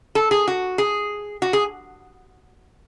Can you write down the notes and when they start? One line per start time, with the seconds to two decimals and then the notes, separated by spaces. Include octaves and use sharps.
0.15 A4
0.31 G#4
0.48 F#4
0.78 G#4
1.42 F#4
1.53 G#4